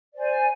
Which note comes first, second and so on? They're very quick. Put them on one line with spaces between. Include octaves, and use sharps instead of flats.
D5 C5 G#5